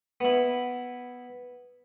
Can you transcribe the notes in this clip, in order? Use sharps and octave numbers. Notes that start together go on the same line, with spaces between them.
B3 E4